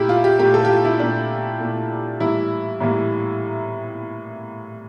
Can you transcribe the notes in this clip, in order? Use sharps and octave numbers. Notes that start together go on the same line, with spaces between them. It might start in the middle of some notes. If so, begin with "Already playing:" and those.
Already playing: A#2 A3 E4 G4
F4
G4
A#2 A3 G4
A4
G4
F4
E4
A#2 A3 D4
A#2 A3
A2 E3 G3 A#3 E4
A2 E3 G3 A#3